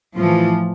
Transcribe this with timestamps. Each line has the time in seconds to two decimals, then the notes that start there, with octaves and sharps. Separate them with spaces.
0.17 A2 E3 F3